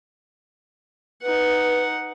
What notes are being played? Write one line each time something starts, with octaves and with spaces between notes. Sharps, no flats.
D#4 B4 F#5